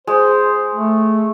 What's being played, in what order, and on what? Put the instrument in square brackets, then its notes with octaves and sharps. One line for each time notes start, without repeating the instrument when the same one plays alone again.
[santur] G#3 [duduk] C5
[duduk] A3